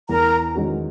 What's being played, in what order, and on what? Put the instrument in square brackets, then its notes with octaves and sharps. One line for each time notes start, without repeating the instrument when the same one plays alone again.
[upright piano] E2 [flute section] A#4 A#5
[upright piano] D#3 G#3 C#4 F#4